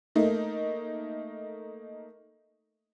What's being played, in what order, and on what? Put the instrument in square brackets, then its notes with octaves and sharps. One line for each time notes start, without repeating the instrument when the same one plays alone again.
[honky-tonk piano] A3 A#3 D#4